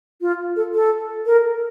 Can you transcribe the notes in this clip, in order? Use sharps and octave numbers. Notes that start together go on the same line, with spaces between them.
F4
A4
A4
A#4